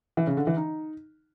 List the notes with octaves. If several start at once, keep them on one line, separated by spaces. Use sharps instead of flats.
E3
C#3
D3
E3
D#4